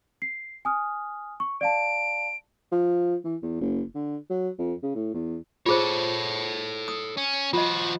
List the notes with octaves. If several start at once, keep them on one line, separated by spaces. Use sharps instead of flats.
C7
G#5 D#6 F6
C#6
D5 F5 A5 D7
F3
E3
E2
F#1
D3
F#3
F2
C#3
A2
E2
F4 G#4 A4 C5 C#5
D#6
C#4
F3 F4 F#4 D#5